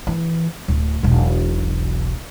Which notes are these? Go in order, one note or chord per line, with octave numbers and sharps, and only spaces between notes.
E3
D1
E1 B1